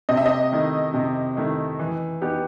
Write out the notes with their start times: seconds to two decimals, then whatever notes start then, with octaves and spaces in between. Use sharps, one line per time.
0.09 C3 D#5
0.17 E5
0.26 D#5
0.52 D#3 A3 E4
0.94 C3
1.37 D#3 A3 E4
1.79 E3
2.21 B3 D#4 G4